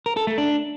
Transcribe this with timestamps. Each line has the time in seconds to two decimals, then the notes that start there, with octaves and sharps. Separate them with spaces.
0.06 A#4
0.17 A4
0.27 A3
0.38 D4